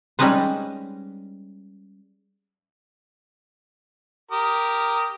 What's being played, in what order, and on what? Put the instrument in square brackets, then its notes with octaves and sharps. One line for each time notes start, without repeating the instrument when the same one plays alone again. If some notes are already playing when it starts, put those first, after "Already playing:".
[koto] G3 G#3 C#4 D#4 B4 C5
[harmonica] G4 A#4 D#6